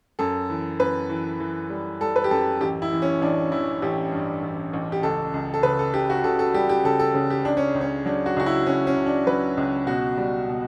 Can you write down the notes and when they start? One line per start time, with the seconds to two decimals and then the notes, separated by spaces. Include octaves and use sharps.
0.19 F#2 A4
0.50 E3
0.80 F#2 B4
1.09 E3
1.40 E3
1.70 G3
2.01 G3 A4
2.16 B4
2.24 G4
2.31 F#2 A4
2.61 A1 G4
2.82 E4
2.92 E3
3.02 C#4
3.21 A1 D4
3.52 E3 E4
3.82 A1 G4
4.12 G2
4.43 A1
4.73 A1
4.92 G4
5.03 C#2 A4
5.34 C#2
5.54 A4
5.63 C#3 B4
5.79 A4
5.94 C#3 G4
6.10 F#4
6.24 C#3 A4
6.39 A4
6.54 G3 G4
6.69 G4
6.84 C#3 A4
6.99 A4
7.14 C#3
7.30 G4
7.45 C#2 D4
7.57 C#4
7.75 C#2
7.81 C#4
8.05 F#3 D4
8.26 F#4
8.37 C#2 F#4
8.46 E4
8.66 C#2 C#4
8.87 C#4
8.97 C#2
9.06 D4
9.27 F#3 B4
9.57 C#2
9.87 B2 F#4
10.18 G3
10.48 B2